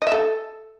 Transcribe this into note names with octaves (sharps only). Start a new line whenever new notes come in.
D#5
E5
A4